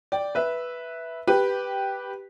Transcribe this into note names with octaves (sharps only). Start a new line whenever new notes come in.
D5 G5
B4 E5
G4 B4